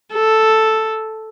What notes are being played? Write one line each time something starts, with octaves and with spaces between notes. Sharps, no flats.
A4